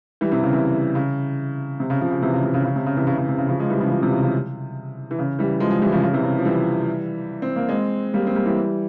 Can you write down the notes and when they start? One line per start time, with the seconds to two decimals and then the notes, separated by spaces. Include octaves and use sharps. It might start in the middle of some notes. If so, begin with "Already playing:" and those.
0.21 E3 G3
0.32 C3 E3
0.43 C#3
0.53 C3 E3
0.95 C#3
1.80 C3
1.90 C#3
2.00 C#3 F3
2.11 C#3
2.22 C3 E3
2.33 C#3
2.44 C3
2.54 C#3
2.65 C#3
2.76 C3
2.86 C#3
2.97 C3 E3
3.07 C#3
3.18 C#3
3.29 C3
3.38 C#3
3.48 C#3 F3
3.59 F3 G#3
3.70 E3 G3
3.80 C#3 F3
3.91 C#3 F3
4.01 C3 E3
4.12 C#3
4.23 C#3
5.11 E3
5.19 C#3
5.39 E3 G3
5.60 F3 G#3
5.71 F3 G#3
5.82 E3 G3
5.92 C#3 F3
6.03 C#3
6.13 C3 E3
6.24 C#3
6.39 F3
6.45 E3 G3
7.42 C4
7.56 A#3
7.69 G#3 C4
8.14 G3 A#3
8.27 C4
8.35 G3 A#3
8.46 E3 G3